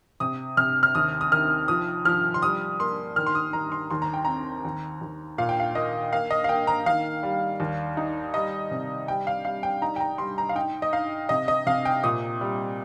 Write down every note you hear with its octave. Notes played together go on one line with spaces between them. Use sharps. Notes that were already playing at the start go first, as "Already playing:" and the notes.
C3 D#6
C3 F6
F6
D#2 D#6
D#6
D#3 F6
F3 D#6
F3 F6
C6
G3 D#6
A#3 C6
D#3 F6
C6
D#6
D#3 A#5
C6
D#2 C6
A#5
G5
C4 A#5
D#2
D#2
A#2 F5
G5
F5
A#3 D#5
A#3 F5
D#5
F5
A#3 G5
A#5
D#3 F5
G3
D#2
D#4
G3 D#5
C3
G3 G5
F5
G3 F5
G5
D#4 A#5
G5
A#5
G3 C6
A#5
F5
D#4 G5
D#5
D#4 F5
C3 D#5
D#5
C3 F5
G5
A#2 D#6
G3